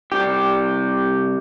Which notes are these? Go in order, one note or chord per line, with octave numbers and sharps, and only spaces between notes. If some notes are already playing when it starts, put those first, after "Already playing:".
C2 G4